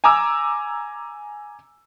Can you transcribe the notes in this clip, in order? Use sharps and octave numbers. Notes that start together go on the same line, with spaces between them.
G#5 A#5 D6 E6